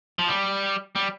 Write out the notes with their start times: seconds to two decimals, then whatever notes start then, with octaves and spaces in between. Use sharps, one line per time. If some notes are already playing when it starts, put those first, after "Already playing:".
0.19 F3
0.28 G3
0.95 G3